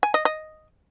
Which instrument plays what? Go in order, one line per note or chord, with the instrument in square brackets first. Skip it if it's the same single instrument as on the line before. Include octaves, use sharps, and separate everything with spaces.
[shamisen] G#5
D#5
D#5